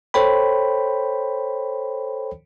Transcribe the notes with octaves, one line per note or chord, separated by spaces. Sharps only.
A4 C5 C#5 G5 B5